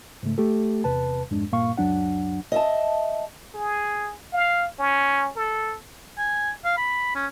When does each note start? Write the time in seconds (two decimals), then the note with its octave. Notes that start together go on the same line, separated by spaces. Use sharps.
0.23 G#2 C#3 A3
0.38 A3 G4 A4
0.84 E2 C3 B4 A5
1.31 F2 G#2 G#3 D4
1.52 G2 A#2 A#3 F5 C#6
1.78 C#2 F#2 F#3 D4 F#5
2.52 D#5 E5 A5
3.54 G#4
4.33 F5
4.79 C#4
5.36 A4
6.18 G#5
6.65 F5
6.77 B5
7.15 C#4